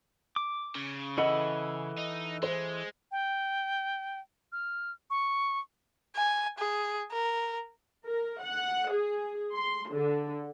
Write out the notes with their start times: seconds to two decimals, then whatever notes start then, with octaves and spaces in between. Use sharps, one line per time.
0.36 D6
0.75 C#3
1.18 E3 A4 D#5 F#5 B5 C#7
1.98 D#4
2.43 G#3 C5
3.12 G5
4.52 F6
5.10 C#6
6.16 G#5
6.59 G#4
7.11 A#4
8.07 A#4
8.42 F#5
8.92 G#4
9.55 C6
9.91 D3